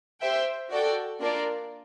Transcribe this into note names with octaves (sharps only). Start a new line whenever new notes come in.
G4 C5 E5 G5
F#4 A4 D5 G5
A#3 D4 F4 A#4 D5